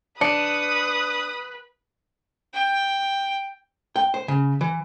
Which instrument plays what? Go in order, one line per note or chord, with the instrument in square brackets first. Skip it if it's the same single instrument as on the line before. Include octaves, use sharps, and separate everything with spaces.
[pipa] D4 [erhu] B4 [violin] D#6 [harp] C#7
[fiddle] G5
[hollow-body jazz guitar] G5
C5
C#3
E3